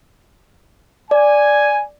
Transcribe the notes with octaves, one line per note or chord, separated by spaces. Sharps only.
D5 G#5